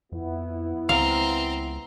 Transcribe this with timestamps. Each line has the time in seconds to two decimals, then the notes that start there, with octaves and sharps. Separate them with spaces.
0.12 F2 B3 E4
0.89 C#2 C4 F5 A#5